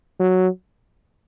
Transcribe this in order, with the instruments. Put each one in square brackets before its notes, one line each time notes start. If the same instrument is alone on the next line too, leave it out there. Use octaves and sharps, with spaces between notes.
[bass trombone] F#3